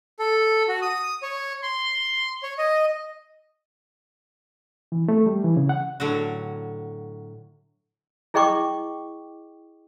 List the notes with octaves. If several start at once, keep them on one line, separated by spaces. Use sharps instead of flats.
A4
F#4
D#6
C#5
C6
C#5
D#5
E3
A3
G3
E3
C#3
F#5
A2 D3 F#3 F#4
E4 G#4 D#5 G5 C#6 D6